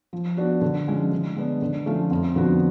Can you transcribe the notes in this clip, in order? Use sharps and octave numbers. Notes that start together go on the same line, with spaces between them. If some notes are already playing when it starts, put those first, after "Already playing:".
F3
B3 D4 F#4
D3
F3 G#3 C#4
D3
G#3 B3 D4
D3
F3 A3 C#4 F4
F2
D3 F3 B3 F#4